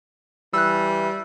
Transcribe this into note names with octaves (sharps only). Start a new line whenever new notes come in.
E3 G3 E6 F#6